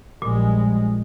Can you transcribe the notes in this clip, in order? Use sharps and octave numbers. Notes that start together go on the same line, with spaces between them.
A#1 A#2 G3 G#3